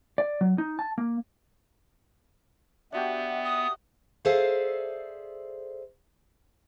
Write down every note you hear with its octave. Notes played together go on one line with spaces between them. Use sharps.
D5
F#3
D#4
A5
A#3
B3 D4 F#4 G4 E5
D#6
G#4 A4 C5 D5 E5 F5